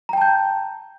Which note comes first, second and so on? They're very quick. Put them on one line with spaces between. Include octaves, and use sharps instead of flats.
A#5 G5 A5 G6